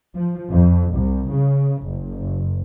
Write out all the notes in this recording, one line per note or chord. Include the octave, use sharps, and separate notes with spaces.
F3
F2
C2
C#3
F#1